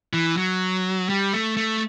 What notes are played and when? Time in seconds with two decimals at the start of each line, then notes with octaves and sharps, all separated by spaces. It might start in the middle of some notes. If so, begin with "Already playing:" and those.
0.13 E3
0.37 F#3
1.10 G3
1.33 A3
1.57 A3